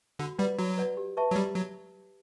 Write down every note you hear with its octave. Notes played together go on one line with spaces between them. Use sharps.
D3 F#4
G3 B4 D5 F#5
F#3 F#4
B4 D5 F#5
G4
B4 E5 A5 C#6
F#3
G3 G4
F#3